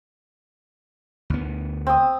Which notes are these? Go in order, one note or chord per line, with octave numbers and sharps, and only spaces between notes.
D2 B3
C4 D#6